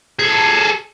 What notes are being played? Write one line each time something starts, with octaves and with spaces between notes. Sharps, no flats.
G#4 A4